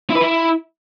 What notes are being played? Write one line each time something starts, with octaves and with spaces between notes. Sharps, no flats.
E4
B4
E4